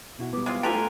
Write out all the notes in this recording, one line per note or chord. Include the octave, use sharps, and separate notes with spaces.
B2 E4 F#4
G3 B3 D6
G#3 C4 F4
A3 D4 F4 G4 G5 G#5 A#5 C6